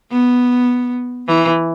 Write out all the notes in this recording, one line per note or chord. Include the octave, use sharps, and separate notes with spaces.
B3
E3